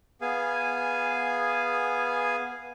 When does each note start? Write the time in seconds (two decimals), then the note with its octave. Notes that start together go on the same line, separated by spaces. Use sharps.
0.21 B3 G#4 F5 G#5